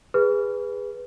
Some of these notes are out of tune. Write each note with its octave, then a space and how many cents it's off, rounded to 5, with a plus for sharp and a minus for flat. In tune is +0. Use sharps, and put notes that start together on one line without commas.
G#4 -20 B4 +0